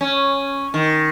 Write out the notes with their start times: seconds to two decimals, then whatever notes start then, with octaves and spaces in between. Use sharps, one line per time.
0.01 C#4
0.74 D#3